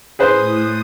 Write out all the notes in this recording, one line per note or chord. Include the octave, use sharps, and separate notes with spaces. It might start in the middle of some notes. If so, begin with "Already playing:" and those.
A2 G#4 B4 C5 D#6